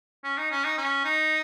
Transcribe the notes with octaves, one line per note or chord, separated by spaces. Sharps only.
C#4
D#4
C#4
D#4
C#4
D#4